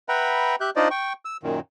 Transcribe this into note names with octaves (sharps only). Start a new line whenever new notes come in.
B4 E5 F#5 G5 A#5 B5
G4 E5 F#6 G6
D4 D#4 F4 C5 D5 D#5
G5 C#6
E6
F#2 A#2 D#3